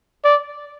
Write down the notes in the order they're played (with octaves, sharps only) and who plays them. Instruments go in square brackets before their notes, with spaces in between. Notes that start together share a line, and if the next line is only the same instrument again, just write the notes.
[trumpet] D5